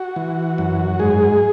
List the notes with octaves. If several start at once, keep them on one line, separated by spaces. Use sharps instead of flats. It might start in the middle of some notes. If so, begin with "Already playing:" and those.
Already playing: F#4
E3
F#2
G#2 G#4